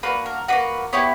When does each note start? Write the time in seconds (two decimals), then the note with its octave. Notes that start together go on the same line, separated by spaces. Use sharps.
0.03 A#3 D4 F#4 B4
0.26 A#4
0.48 A#3 D4 F#4 B4
0.93 B3 E4 G4 C#5